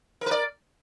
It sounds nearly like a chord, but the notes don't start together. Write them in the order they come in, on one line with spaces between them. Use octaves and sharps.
A#4 B4 D5